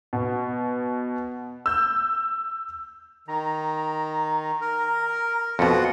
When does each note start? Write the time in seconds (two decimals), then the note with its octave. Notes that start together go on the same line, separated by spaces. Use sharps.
0.13 B2
1.66 E6 G6
3.28 D#3 A#5
4.61 A#4
5.59 F2 B2 F4 F#4 F#5